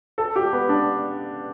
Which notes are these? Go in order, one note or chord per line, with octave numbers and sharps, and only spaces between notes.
A4
G4
B3
D4